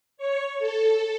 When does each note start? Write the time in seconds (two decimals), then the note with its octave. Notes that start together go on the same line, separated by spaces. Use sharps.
0.17 C#5
0.59 A4